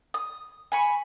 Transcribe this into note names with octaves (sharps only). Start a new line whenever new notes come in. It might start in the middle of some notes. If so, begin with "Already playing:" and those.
D#6
G#5 B5 C#6